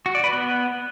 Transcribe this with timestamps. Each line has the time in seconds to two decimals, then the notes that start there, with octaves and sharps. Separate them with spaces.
0.06 F#4
0.15 D5
0.24 B4
0.33 B3